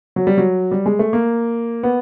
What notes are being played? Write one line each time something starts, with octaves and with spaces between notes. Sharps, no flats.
F#3
G3
F#3
G3
G#3
A3
A#3
B3